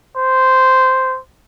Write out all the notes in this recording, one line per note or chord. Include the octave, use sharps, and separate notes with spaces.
C5